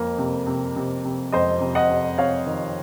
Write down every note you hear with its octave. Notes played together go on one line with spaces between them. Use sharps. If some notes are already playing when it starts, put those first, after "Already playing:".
Already playing: F2 A#3
C3
C3
C3
C3
F2 C5 D#5
C3
D#5 F#5
C3
C3 C#5 F5
D#3